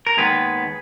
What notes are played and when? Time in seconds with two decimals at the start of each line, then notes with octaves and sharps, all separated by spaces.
0.07 A#4
0.17 D#2 D#3 G#3 B3 G#4 B4